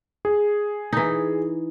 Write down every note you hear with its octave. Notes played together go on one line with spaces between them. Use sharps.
G#4
E3 D#4